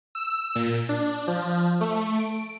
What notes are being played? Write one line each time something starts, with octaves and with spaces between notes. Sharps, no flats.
E6
A#2
D4
F3
A3
D7